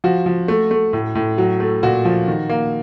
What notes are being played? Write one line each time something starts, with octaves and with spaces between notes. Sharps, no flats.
F3 F#4
F3
A3
A3
A2
A2
F#3
A3
A#2 F#4
F3
D#3
A#3